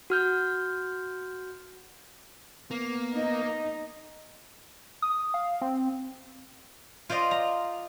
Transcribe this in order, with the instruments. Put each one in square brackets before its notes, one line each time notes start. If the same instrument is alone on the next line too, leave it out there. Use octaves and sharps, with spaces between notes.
[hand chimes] F#4 F6 G6
[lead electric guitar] A#3 [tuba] B3
[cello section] D#4 [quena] D#5
[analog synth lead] D#6
F5
C4
[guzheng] F4 C5 D5 D#5 F5
A#5